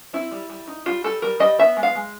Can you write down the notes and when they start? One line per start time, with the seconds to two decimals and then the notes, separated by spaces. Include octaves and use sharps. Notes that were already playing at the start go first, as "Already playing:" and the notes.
0.13 C4 E4
0.31 G3
0.50 G3
0.67 D#4
0.86 G3 F4
1.04 G3 A4
1.22 G3 A#4
1.40 G3 D#5
1.59 B3 E5
1.77 G#3
1.83 F5
1.95 G#3